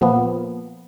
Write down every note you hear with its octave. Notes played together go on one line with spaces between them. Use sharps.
A#2 F3 A#3 B3